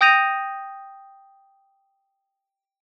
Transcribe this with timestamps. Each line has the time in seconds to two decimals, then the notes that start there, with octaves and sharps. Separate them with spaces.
0.01 G5 D#6 G6 A#6 D#7 F7